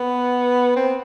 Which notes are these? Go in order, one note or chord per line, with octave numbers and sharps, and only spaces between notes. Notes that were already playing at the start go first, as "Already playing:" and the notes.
Already playing: B3
C4